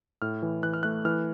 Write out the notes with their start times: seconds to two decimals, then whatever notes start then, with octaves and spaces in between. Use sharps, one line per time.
0.22 A2 F6
0.42 E3
0.63 E3 F#6
0.74 F6
0.83 A3 F#6
1.05 E3 F6